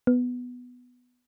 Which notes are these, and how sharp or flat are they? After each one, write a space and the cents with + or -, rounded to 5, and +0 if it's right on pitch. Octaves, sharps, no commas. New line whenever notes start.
B3 +5